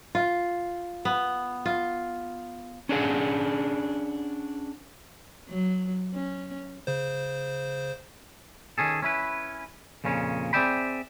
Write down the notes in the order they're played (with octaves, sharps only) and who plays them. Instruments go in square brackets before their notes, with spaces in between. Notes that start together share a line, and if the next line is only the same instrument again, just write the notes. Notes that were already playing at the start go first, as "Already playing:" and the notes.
[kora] F4
B3
F4
[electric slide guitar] C#4 D4 G#4 F#5
[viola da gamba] F#3
C#4
[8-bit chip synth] C#3 C5
[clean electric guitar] D#3 C#4 G#4 A4
C#4 E4 B4
F2 A#2 C#3 C#4
C4 G#4 D5 E5 G5 B5